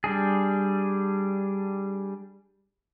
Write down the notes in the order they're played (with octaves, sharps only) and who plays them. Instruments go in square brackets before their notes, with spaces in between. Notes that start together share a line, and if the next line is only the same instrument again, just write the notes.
[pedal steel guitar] G3 D4 G#4